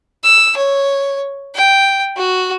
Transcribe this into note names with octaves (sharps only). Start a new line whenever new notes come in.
E6
C#5
G5
F#4